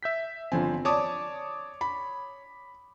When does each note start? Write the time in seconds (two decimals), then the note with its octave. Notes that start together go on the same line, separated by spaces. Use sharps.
0.03 E5 G6 B6
0.52 G1 F3 C4 G#5
0.85 C#5 D5 A5 D6 D#6
1.81 B5